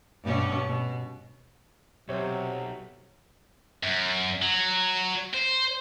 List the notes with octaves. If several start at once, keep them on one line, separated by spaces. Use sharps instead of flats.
G2 B2 C#4
B2
B1 C3 F#3 C5 C#5
F#2
F#3
C5